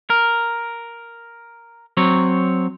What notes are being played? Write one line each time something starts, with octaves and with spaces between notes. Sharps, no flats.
A#4
F#3 C4 C#5